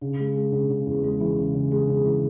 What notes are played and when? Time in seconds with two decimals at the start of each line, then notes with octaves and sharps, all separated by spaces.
0.01 C#3
0.19 G#3
0.36 G#3
0.52 C#3
0.70 C#3
0.87 E2
1.04 G#3
1.20 E3
1.37 C#3
1.55 C#3
1.71 G#3
1.88 C#3
2.05 E3